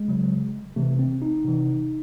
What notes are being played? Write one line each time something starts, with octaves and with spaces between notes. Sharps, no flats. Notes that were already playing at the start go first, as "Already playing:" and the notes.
Already playing: G#3
C#3 F#3
C3 E3 A3
C4
D#4
C3 E3